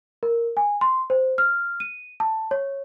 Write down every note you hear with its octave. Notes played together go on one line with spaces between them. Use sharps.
A#4
G#5
C6
C5
F6
D#7
A5
C#5